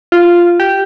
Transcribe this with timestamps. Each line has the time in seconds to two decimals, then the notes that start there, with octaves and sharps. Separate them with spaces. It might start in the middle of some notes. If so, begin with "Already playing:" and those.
0.12 F4
0.60 G4